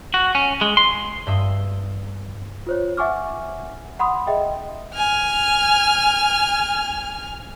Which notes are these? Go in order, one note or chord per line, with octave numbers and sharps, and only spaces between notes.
F#4
C#4
G#3
C6
G2 E5 D#6
F4 C5 C#5
E5 F#5 G#5 C#6 D6 F6
F#5 B5 C6 D#6
G#4 D#5 E5 G5
G#5 F6